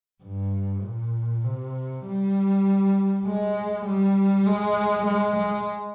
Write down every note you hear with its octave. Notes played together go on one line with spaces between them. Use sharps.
G2
A#2
C3
G3
G#3
G3
G#3
G#3
G#3